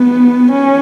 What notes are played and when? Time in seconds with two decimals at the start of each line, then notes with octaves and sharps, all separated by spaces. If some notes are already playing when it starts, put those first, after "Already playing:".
Already playing: B3
0.51 C#4